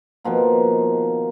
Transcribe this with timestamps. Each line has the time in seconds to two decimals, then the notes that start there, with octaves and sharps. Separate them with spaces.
0.24 B2 D#3 F3 A#3